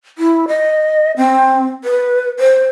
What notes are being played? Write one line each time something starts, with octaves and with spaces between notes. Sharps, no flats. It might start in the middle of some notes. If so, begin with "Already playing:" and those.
E4
D#5
C4
B4
C5